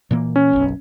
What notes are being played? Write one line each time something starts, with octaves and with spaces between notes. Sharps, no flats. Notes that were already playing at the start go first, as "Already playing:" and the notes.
A#2 E3 A#3
C#4
F#1 B1